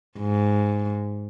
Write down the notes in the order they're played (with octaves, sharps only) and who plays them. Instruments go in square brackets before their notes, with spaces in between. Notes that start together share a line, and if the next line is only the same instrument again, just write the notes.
[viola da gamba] G#2